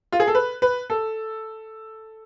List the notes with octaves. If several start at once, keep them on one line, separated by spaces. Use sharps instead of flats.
F4
G#4
A4
B4
B4
A4